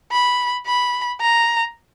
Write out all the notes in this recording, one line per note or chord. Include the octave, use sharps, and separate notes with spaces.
B5
B5
A#5